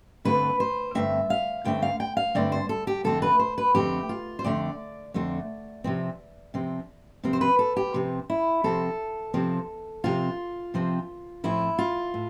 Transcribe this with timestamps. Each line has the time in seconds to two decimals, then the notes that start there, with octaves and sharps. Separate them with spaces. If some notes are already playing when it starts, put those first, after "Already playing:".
0.25 G2 D3 A3 C4 B4
0.60 C5
0.95 G2 D3 A3 C4 E5
1.30 F5
1.64 G2 D3 A3 C4 G5
1.82 F5
2.00 G5
2.17 F5
2.35 G2 D3 A3 C4 D5
2.52 C5
2.69 A4
2.87 G4
3.04 F2 D3 A3 C4 A4
3.22 B4
3.39 C5
3.58 B4
3.75 F2 D3 A3 C4 G4
4.09 F4
4.39 C5
4.44 F2 D3 A3 C4 D5
5.14 F2 D3 A3 C4
5.84 C3 F3 C4
6.54 C3 F3 C4
7.23 C3 F3 C4
7.33 C5
7.41 B4
7.59 A4
7.76 G4
7.94 C3 F3 C4
8.30 E4
8.64 C3 F3 C4 A4
9.34 C3 F3 C4
10.04 C3 F3 C4 F4
10.74 C3 F3 C4
11.44 A2 F3 C4 E4
11.78 F4
12.14 A2